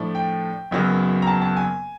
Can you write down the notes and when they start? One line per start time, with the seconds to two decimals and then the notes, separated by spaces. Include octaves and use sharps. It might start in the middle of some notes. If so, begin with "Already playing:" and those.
Already playing: A2 F3 A3 D4
0.15 G5
0.71 F#1 F#2 C#3 F#3 B3
1.22 A#5
1.27 A5
1.42 A5
1.56 G#5